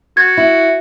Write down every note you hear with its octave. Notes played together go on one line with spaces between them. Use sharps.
F#4 G#6
E4